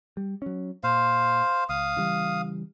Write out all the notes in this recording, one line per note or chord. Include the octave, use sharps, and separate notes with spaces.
G3
F#3 C#4
A#2 C5 F5
C#2 F5 D#6
C#3 E3 G3